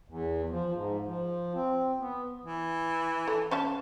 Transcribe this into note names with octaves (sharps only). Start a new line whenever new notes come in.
E2
F3
G#2
F3
C4
B3
E3
A4
C#4 F5 A5